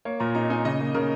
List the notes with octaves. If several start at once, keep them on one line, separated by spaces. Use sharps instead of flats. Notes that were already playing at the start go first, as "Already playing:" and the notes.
A#3 C#5
A#2 A#5
D#4 A#5
D#4 G#5
C#3 D#5
A#3
C#3 A#4